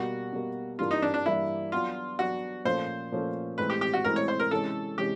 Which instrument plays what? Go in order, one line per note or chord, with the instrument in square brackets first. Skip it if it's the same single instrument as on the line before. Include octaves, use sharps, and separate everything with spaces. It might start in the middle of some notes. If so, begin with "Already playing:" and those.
Already playing: [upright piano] B2 G3 A#3 [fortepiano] F#4
[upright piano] B2 G3 A#3
[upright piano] G2 E3 G3 A#3 D4 [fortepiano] F4
[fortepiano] D#4
D4
D4
[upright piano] G2 E3 G3 A#3 D4 [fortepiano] E4
[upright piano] F#3 B3 D4 [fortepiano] F4
[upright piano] F#3 B3 D4 [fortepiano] F#4
[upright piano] A#2 F3 A3 C#4 F4 [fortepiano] C5
[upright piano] A#2 F3 A3 C#4 F4
[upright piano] A2 E3 G#3 C4 E4 [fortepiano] B4
[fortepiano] G4
G4
F#4
[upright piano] A2 E3 G#3 C4 E4 [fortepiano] A#4
[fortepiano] C#5
C5
A#4
[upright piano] C3 E3 G#3 C#4 [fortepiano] A4
[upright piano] C3 E3 G#3 C#4 [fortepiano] G4